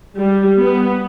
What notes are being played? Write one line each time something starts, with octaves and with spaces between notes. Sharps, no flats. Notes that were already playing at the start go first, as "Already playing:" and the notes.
G3
B3